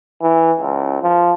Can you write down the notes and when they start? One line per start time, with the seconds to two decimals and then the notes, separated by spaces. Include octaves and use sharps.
0.22 E3
0.60 C#2
1.03 F3